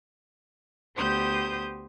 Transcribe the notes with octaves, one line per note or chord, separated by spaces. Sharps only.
D2 B3 G4 C5 D#6 G6